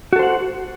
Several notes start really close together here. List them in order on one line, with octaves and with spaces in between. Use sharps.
F#4 A4 C5 F#5